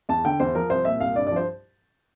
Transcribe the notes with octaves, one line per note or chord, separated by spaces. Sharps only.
E2 A5
D3 G5
E2 C5
F3 A#4
C2 C5
A#2 E5
C2 F5
G2 D5
D5
F3 C5